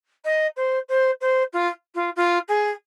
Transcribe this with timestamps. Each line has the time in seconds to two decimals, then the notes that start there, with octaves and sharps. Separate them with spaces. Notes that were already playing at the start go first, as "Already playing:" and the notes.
0.24 D#5
0.56 C5
0.88 C5
1.21 C5
1.53 F4
1.95 F4
2.16 F4
2.48 G#4